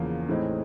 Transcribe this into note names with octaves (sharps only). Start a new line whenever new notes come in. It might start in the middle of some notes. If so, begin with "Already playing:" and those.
Already playing: E2 C#3 F3 A#3
A2 E3 G#3 C4 D#4